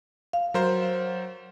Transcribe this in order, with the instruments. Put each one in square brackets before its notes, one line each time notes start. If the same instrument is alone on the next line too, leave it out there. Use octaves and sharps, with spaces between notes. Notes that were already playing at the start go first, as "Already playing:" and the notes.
[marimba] F5
[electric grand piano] F#3 A#4 C5